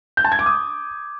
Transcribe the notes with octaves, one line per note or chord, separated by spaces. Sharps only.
G6
A5
G#6
D6
D#6